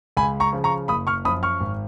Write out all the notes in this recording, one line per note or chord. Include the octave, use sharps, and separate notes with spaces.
C#2 G#5 B5
A#5 C#6
C#3 F3
A#5 C#6
F#1 B5 D#6
C#6 F6
F#2 F3 B5 D#6
C#6 F6
G#1